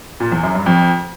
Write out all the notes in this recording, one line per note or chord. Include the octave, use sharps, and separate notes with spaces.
A#2
E2
F#2
G2
F2